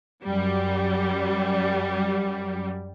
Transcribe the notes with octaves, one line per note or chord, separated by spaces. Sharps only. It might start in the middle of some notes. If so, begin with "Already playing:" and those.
F#2 G3